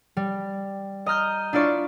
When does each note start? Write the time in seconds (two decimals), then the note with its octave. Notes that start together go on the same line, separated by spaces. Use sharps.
0.17 G3
1.06 D#5 A#5 F6 G6
1.53 D4 E4 F4 D5 C#6